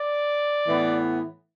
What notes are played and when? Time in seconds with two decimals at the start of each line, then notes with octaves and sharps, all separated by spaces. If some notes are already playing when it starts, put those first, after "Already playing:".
Already playing: D5
0.67 A2 E3 B3